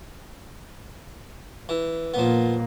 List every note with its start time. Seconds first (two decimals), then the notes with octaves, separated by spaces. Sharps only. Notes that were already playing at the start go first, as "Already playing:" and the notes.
1.69 E3
2.14 A#2 F3 A#3 B3